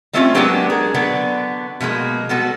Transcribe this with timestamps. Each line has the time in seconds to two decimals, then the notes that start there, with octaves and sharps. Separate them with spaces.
0.13 G3 A3 C4 C#4 E4 F4
0.35 F#3 G#3 A#3 B3 D4 G4
0.70 G#4 A#4
0.94 D3 F#3 B3 D4
1.80 B2 F3 G#3 A#3
2.29 G3 B3 F#4 A4